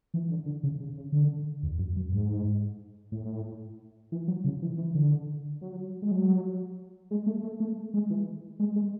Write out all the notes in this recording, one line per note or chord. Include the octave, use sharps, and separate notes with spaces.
E3
D3
D3
C#3
C#3
C#3
D3
E2
F#2
F#2
G#2
A2
E3
F#3
C#3
E3
E3
D3
F#3
G#3
F#3
G#3
A3
A3
A3
G#3
E3
G#3
G#3